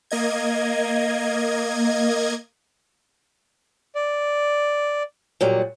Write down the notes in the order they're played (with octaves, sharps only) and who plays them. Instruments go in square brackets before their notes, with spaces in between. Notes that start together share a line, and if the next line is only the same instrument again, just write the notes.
[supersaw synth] A#3 D#5 G#6
[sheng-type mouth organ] D5
[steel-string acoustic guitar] A#2 F#3 G3